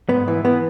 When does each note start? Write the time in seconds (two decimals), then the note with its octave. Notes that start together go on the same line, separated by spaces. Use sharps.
0.09 G#2 B3
0.28 E3
0.44 E3 B3